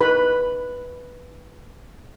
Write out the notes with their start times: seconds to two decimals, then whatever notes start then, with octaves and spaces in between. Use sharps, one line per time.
0.01 D#4 B4 B5